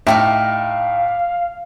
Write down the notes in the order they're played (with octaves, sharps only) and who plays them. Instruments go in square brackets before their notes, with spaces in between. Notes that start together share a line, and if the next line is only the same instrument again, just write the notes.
[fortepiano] A2 [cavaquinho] D#4 F4 G4 [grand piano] E5 [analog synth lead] F5